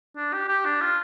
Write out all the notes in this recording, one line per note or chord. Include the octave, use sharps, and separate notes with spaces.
D4
G4
G4
D4
F4